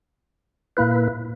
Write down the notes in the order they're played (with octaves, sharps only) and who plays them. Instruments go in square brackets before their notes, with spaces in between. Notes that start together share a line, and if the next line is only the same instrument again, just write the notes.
[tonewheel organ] A#2 A#3 E4 B4